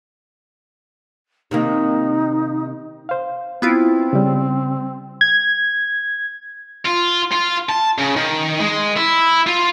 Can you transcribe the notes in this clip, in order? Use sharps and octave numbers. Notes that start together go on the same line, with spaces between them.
C3 D#3 A#3 D#4
C5 F5
B3 C4 E4 F4
C#3 G3
G#6
F4
F4
A5
C#3
D#3
G#3
E4
F4